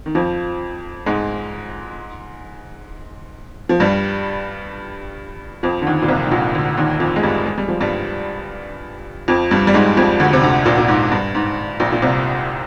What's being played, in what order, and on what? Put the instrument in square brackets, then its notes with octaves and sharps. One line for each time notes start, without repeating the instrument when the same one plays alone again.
[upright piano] D#3
F2 F3
G#2 G#3
F3
G2 G3
F2 F3
D3
D#2 D#3
A#2
C2 C3
G#2
A#1 A#2
D2 D3
D#2 D#3
F2 F3
G#3
G2 G3
G#3
G3
F3
G2 G3
F2 F3
G2 G3
G3
G#2 G#3
F2 F3
D2 D3
C3
D2 D3
A#1 A#2
A#2
G#2
G2
G#2
A#1 A#2
A#2
C2 C3